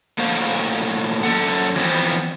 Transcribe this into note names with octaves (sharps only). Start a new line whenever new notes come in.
A2 A#3 F#4 C5 F5
F#2 A4 F#5
E3 F3 B3 C4